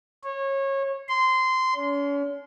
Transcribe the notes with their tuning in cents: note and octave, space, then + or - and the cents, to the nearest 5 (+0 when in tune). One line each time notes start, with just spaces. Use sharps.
C#5 -25
C6 -15
C#4 +40